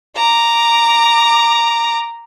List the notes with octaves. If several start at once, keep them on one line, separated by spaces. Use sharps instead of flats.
A#5 D6